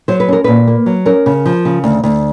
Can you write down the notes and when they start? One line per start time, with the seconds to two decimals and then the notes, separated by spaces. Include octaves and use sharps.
0.08 F#3 C5
0.20 B4
0.28 C#4 A#4
0.44 A#2 B4
0.67 A#3
0.86 F#3
1.06 C#4 A#4
1.26 C#3
1.46 F3
1.65 C#3
1.84 D2
2.04 D2